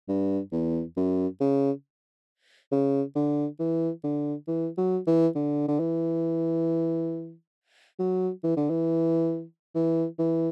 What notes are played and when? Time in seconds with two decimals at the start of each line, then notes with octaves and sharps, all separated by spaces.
0.09 G2
0.52 E2
0.97 F#2
1.41 C#3
2.72 C#3
3.15 D3
3.59 E3
4.04 D3
4.48 E3
4.78 F#3
5.07 E3
5.35 D3
5.68 D3
5.80 E3
7.99 F#3
8.44 E3
8.57 D3
8.70 E3
9.75 E3
10.19 E3